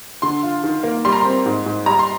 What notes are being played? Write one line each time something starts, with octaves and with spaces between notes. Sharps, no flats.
D3 C6
F4
D#3
A#3
G3 C6
A#5
C4 C6
G#2
G#2
G3 A#5
C6